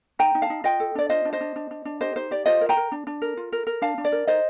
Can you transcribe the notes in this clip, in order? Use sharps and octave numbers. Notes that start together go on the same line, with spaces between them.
D#4 G5 A#5
D#4
F5 A5
D#4
F4 D#5 G5
A4
D4 D5
F4 C5 D#5
D4
C5 D#5
D4
D4
D4
D4
G4 C5 D#5
D#4 C5
G4 D5
F4 C5 D#5
A#4
G5 A#5
A#4
D4
D4
A#4
F4
A#4
A#4
D4 F5 A5
D4
D5
A#4
D#4 C5 D#5